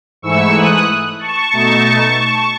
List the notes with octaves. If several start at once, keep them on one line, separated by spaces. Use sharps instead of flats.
G#2 E3 A3 E4 C#6 E6
D#6 F#6
A5 C#6
B2 A3 D#4